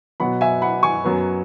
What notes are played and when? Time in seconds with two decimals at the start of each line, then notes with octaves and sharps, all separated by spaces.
0.20 B2 F#3 B3 F#5 B5
0.41 E5 G#5
0.62 F#5 B5
0.83 G#5 C#6
1.04 F#2 F#3 B3